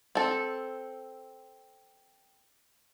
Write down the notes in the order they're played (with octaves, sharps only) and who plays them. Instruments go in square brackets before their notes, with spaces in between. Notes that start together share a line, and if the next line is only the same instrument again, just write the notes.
[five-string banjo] C4 A4